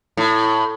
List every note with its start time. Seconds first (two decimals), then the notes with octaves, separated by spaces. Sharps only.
0.17 A2